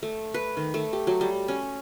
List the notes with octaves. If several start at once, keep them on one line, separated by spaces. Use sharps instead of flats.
A3
B4
D#3
A3
G4
F#3
G3
C#4